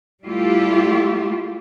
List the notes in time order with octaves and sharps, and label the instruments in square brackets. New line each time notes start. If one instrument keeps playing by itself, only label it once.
[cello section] G3 A3 E4 F4 G4